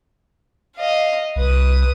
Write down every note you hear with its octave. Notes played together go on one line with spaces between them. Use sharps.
D#5 F5
C2 B4 D#6